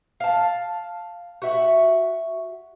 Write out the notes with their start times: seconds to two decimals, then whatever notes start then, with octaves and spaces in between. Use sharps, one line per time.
0.20 F5 A5
1.42 F#4 E5 F#5